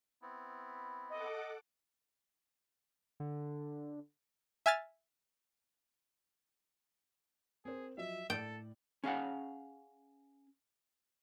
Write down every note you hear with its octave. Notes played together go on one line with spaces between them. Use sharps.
B3 C4 E4
A4 D#5 F#5 D6
D3
E5 G#5 F6 A6
C4 G#4 A#4 C5
F3 F#3 D#5 E5
A2 A4 D5 G5
C#4 G#4 F5 F#5